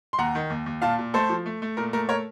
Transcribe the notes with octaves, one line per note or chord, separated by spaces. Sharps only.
C6
D#2 F#5 A#5
D#3
D#2
D#2
A#2 F5 A5
A#2
A3 A4 C5
F3
A3
A3
A#2 A#4
A3 A#4
A#4 C#5